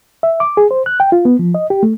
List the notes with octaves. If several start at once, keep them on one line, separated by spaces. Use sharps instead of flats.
E5
D6
G#4
C5
F#6
G5
F4
B3
F3
D#5
G4
A3